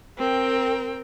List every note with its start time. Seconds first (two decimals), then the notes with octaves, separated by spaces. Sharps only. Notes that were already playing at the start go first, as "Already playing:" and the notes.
0.18 C4 A#4 G5